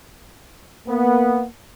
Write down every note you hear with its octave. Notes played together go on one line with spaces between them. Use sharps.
A#3 B3